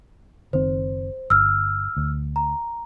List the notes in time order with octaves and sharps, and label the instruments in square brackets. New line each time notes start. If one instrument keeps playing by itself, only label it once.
[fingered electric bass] F#1 D#3 C4 [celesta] C5
[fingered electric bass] G1 [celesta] E6 F6
[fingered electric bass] D2
[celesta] A#5